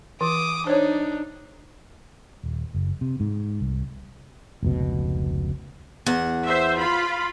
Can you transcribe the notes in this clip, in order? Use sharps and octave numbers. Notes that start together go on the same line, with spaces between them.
E3 D6 D#6
D4 D#4 C5 C#5
D#1
F#1
C3
G#2
C2
F1 C#2 B2
E2 F#5
C5 E5
F4 B5